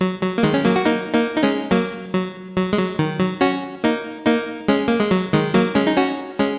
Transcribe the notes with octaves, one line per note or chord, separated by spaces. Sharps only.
F#3
F#3
A#3
D#3 G#3
C#4
F#3 A#3
F#4
A#3 D#4
A#3 D#4
D#4
G#3 C#4
F#3 A#3
F#3
F#3
G#3
F#3
D#3
F#3
C#4 F#4
A#3 D#4
A#3 D#4
G#3 C#4
A#3
G#3
F#3
D#3 G#3
F#3 A#3
G#3 C#4
D#4
C#4 F#4
G#3 C#4